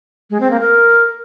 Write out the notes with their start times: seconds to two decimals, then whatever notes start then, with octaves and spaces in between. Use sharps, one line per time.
0.30 G#3
0.40 C4
0.51 A#3
0.61 A#4